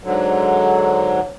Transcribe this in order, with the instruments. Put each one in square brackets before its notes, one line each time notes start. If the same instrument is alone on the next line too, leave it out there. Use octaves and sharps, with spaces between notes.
[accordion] G#2 D3 F#3